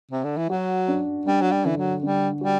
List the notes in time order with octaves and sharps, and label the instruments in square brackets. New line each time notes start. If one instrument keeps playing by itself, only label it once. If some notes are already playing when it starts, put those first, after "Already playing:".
[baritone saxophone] C3
D3
E3
[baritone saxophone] F#3 [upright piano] F#4
[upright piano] D4
[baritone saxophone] G3 [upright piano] D4
[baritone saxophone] F#3
G3
[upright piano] D3 [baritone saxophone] E3
[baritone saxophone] F#3
[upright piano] D3 [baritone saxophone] G3
[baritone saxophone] G3 [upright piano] F#4